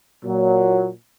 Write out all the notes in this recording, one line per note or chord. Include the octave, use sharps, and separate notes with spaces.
A#2 F#3